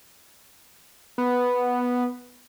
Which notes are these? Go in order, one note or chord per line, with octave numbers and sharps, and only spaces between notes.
B3